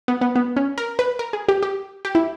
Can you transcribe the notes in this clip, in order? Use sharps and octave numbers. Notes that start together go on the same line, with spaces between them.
B3
B3
B3
C#4
A#4
B4
A#4
G#4
G4
G4
G4
E4